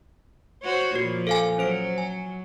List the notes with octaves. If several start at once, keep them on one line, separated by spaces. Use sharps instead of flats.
F#4 C5 C#5
A#2 F3 F#4
A4 F5 G#5
F#3 C#4 C5 D7
G#5